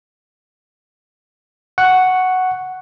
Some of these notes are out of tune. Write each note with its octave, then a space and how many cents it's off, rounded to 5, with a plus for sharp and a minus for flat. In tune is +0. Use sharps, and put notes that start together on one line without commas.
F#5 +0 C#6 +0